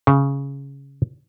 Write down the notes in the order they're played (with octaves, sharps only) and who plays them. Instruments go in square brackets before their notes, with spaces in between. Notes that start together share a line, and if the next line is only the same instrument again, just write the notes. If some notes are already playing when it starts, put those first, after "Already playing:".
[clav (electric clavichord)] C#3